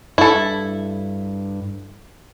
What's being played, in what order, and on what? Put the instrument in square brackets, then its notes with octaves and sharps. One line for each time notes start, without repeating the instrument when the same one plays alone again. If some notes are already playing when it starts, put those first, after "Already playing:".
[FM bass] G2 [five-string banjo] E4 A4